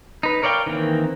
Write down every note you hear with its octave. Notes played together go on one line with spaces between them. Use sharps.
D#4 B4
A#4 C#5 D5 F5 G5
D#3 E3 A#3 C4